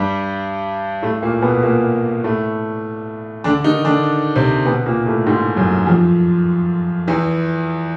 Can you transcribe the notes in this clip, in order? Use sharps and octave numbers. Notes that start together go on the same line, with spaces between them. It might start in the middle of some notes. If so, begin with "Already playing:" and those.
Already playing: G2 G3
A2 A3
A#2 A#3
B2 B3
A#2 A#3
A2 A3
D3 D4
D#3 D#4
D3 D4
C3 C4
B2 B3
A#2 A#3
A2 A3
G#2 G#3
F#2 F#3
F2 F3
E2 E3